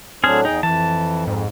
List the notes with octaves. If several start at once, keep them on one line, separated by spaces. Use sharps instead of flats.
A2 F#3 C4 D4 G#4 F6
E2 D#4 G#4 G5
F2 E3 A5
G#2